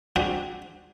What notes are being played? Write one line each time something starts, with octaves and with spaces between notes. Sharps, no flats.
C4 D4 F#4 G#4 F#5 G5